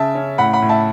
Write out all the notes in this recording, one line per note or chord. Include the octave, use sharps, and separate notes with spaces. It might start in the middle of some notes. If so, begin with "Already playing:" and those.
Already playing: C#3 E5 A5
C#4
A2 F#5 B5
F#5 B5
A2
E5 A5